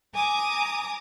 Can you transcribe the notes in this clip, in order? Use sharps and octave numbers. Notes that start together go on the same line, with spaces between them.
G#5 A#5 D6 D#6